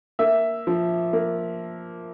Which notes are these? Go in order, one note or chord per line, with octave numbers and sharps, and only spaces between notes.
A#3 E5
F3
A#3